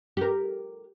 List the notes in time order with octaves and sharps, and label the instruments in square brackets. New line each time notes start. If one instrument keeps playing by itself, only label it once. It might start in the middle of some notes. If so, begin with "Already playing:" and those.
[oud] G4 A#4